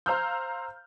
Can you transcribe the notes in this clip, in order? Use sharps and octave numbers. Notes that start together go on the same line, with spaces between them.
C5 F5 A#5 E6 F6 G6